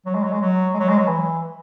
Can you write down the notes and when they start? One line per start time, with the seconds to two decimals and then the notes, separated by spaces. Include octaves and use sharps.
0.06 F#3
0.15 G#3
0.23 F#3
0.33 G#3
0.41 F#3
0.74 G#3
0.80 F#3
0.89 G#3
0.98 F#3
1.07 E3